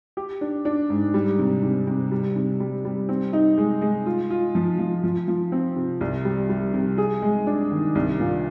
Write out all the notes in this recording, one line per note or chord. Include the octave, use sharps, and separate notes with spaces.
G4
D4
D4
G#2
G3
C3
C3
C3
G3
C3
G3
G3
C4
D#4
G#3
G#3
F4
F4
F3
F3
F3
F3
C4
C3
C2
G3
G3
C3
G#4
G#3
D4
D#3
C2
A#2